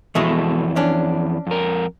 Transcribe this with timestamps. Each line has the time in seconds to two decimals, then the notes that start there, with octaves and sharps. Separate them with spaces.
0.15 F2 B2 E3 G#3 A3
0.76 C#4 D4
1.47 F2 A#4